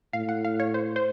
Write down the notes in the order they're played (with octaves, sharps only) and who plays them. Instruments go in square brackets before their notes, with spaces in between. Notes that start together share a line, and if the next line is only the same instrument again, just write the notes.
[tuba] A2 [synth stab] F5
[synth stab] F#5
F5
C#5
C5
C5